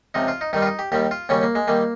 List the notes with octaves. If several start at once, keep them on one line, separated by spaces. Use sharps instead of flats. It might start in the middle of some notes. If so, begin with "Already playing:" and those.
C#2 C3 F3 D#4
F4
D#4
G2 D#3 G3 D#4
F4
D#4
G4
D#2 D#3 G3 G4
F4
D#2 C#3 G3 C#4
A#3
G#3
D#3 G3 A#3